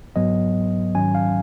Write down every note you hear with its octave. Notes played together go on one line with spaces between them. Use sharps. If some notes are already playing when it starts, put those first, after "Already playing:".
G#2 F#3 B3 D#5
G#2 D#3 F#3 C#4 G#5
F5